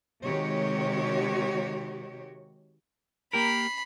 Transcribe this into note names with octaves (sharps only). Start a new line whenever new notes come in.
C3 D#3 G#3 F#4 G4 C#5
A#3 G4 A#4 B5 C7